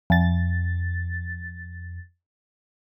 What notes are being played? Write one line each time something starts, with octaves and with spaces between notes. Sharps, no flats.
F2 A6